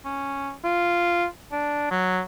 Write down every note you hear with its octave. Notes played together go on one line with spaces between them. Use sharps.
C#4
F4
D4
F#3